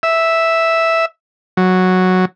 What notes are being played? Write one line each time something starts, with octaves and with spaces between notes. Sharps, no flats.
E5
F#3